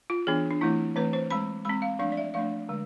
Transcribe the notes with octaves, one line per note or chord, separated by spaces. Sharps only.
F4
E3 B3 D4 G#4
D4
E3 A3 C4 E4
E3 A3 C4 B4
C5
G#3 C4 B5
G#3 C4 B5
F5
F3 A3 D4 F5
D5
E5
F3 A3 D4 F5
D3 G#3